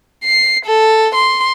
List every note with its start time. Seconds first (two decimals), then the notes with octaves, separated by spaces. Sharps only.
0.24 C7
0.65 A4
1.15 C6